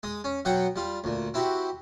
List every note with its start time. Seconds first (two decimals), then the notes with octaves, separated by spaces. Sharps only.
0.03 G#3 D#6
0.24 C#4
0.45 B2 F#3 F#5 G5 C#6
0.76 G3 F4
1.04 D2 A#2
1.34 C4 E4 F#4 G4